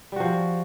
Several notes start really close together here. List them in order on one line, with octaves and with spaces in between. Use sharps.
G3 F#4 F3